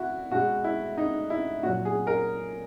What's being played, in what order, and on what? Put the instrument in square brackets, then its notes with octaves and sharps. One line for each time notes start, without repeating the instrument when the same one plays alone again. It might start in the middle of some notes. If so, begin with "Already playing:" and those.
Already playing: [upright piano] E4 F#4
B2 G#3 F#4
E4
D#4
E4
A#2 F#3 F#4
G#4
A#4